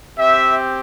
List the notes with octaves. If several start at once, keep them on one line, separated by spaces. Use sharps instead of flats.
C4 G4 E5